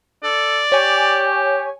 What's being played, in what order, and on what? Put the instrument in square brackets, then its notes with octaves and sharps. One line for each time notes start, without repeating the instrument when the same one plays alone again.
[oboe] A4 [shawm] D5
[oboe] G4 [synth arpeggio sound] C#5 G#5